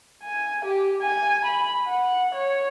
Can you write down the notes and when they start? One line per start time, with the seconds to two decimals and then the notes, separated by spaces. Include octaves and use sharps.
0.23 G#5
0.65 G4
1.02 G#5
1.45 B5
1.87 F#5
2.34 C#5